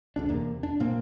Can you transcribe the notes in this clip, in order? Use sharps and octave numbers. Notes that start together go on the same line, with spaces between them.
E1 D2 D4
E2 C3 A#3
D4
A#2 A#3 C4